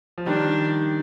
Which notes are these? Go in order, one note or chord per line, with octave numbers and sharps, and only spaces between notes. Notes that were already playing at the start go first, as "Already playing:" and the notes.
F3
D#3 G3 D4